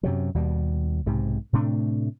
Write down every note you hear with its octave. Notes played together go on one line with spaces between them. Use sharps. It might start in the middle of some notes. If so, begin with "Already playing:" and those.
F#2 C3 F#3
D#2 B2 G3
B1 G#2 C3
A2 C3 A3 D4